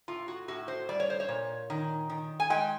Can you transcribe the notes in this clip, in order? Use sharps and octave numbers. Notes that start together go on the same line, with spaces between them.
A2 F4
F#4
A2 F#4
C5
G3 D5
C#5
C5
C#5
A#2
D#3
D#3
G#5
G#3 G5